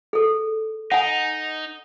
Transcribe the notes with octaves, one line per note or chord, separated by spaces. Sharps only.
G#4 A4
D#4 F#5 G#5